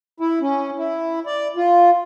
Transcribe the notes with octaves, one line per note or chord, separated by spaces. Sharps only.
E4
C#4
E4
D5
F4